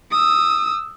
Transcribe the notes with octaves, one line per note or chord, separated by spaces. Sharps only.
D#6 E6